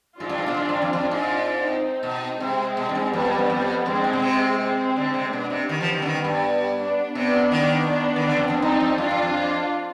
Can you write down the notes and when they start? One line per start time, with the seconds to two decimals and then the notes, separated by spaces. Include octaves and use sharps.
0.20 G#2 D4 F4
0.29 G2
0.38 G#2
0.48 B2
0.57 G#2
0.69 G2
0.82 F2
0.93 F2 D4 F4
1.11 G#2
1.67 C4 D#4
2.03 B2
2.39 C3 G#3 C4
2.77 B2
2.89 G2
2.95 G#2
3.13 F2 G3 B3
3.38 G2
3.50 F2
3.86 F2 G#3 C4
3.95 G2
4.04 G#2
4.13 B2
4.22 C3
4.59 G#3 C4
4.96 D3
5.14 C3
5.32 B2 B3 D4
5.50 C3
5.69 D#3 G3 B3
5.81 F3
5.93 D#3
6.02 D3
6.06 D#3
6.25 G2
6.79 B3 D4
7.15 C3 B3 D4
7.52 D#3
7.88 B3 D4
8.16 D#3
8.26 D3
8.37 F2
8.50 F2
8.62 G2 C4 D#4
8.81 F2
8.98 G2 D4 F4
9.11 G2
9.22 F2